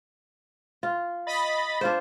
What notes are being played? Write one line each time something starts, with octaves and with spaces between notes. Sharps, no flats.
F4
D#5 B5 A6
D4 F4 C5